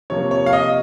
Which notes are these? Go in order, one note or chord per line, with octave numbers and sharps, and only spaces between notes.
C3 F3 A#3 C#5
C#5
F5
D#5